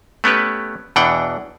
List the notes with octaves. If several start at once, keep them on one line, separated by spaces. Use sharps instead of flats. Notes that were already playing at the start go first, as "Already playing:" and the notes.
A3 B3 C#4 G4 B4
E2 B2 E3 D4 F#5 G5